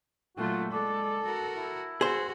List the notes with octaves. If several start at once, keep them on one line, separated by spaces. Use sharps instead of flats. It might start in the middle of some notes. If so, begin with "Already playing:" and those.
A#2 F#3 A3 F4 F#4
G#3 A4 D5
F#4 A#4
E4
F#4 G#4 C5